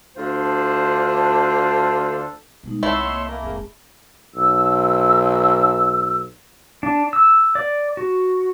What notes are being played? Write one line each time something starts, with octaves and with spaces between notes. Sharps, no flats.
D2 D4 F4 A4 C5
B2 G3 G#3 D#4
C2 A3 E4 C#5 E5 F#5 C6
A#3 D#5
A#3 E5 G#5 B5
F1 G#2 G#4
B1 E6
D4
E6
D5
F#4